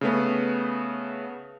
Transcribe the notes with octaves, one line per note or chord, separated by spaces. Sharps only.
C#3 A3 B3